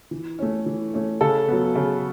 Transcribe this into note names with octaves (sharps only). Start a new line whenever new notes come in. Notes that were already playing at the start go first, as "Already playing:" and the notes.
E3
A3 C#4
E3
A3 C#4
C#3 A4
F#3 B3
C#3